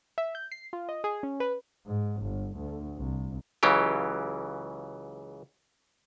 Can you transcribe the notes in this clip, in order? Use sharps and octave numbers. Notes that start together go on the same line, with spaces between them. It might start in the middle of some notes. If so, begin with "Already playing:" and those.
E5
G6
C7
F4
D#5
G#4
C#4
B4
G#2
G1
D2
C2
C#2 C#3 E3 F#3 G4